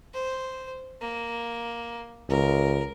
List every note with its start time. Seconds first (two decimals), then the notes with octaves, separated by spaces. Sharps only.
0.14 C5
1.01 A#3
2.30 C#2 A#4